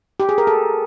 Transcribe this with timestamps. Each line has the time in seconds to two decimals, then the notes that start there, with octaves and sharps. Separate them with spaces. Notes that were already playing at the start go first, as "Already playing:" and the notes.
0.20 G4
0.29 G#4
0.38 A#4
0.47 A4